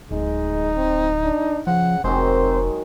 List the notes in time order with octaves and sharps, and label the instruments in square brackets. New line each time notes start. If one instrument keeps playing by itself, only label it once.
[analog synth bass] D1 [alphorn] G#3 [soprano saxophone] D#4
[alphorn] C4
D4
[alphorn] C#3 [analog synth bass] F3 [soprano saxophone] F#5
[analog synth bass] F1 [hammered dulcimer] D#3 F#3 G#3 [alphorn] C4 [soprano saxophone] C5